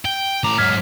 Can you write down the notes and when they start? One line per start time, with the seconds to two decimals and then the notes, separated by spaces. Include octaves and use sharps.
0.05 G5
0.44 A2 A#5 D6
0.58 G#2 F#3 F6 G#6 B6